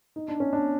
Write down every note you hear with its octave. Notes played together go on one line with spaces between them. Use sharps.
D#4
D4
C#4
D4